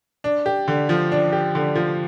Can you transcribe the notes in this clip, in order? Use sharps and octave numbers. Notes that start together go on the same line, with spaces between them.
D4
G4
D3
F3
D4
G4
D3
F3